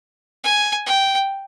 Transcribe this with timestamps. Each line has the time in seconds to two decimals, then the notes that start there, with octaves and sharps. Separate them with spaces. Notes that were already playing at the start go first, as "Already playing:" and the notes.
0.44 G#5
0.86 G5